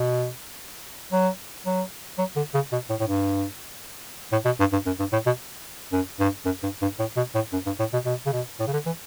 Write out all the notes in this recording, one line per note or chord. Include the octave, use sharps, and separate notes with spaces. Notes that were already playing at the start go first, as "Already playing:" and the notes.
Already playing: B2
F#3
F#3
F#3
D3
C#3
B2
A2
A2
G2
A2
B2
G2
G2
F#2
G2
A2
B2
F#2
G2
F#2
G2
G2
A2
B2
A2
F#2
G2
A2
B2
B2
C#3
B2
A2
C#3
D3
E3